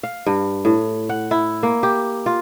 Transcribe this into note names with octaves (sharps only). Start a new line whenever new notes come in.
F5
G2
A2
F#5
E4
A#3
G4
F4